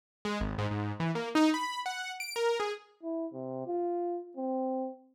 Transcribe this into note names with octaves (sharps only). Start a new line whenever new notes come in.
G#3
G#1
G#2
G#2
E3
A#3
D#4
B5
F#5
D7
A#4
G#4
E4
C3
F4
C4